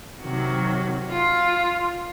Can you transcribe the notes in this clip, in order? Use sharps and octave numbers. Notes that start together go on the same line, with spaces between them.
C3 D#3 F#3 F#4
F4